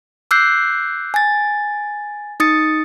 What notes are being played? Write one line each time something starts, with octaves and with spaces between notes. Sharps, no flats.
D6 E6 F#6 G6 C7
G#5 A6
D#4 D#6 A6 C#7